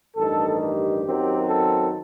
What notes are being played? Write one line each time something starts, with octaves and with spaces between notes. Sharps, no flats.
A1 G2 D#3 A4
G4
F#2 D#3 F#3 C4
A4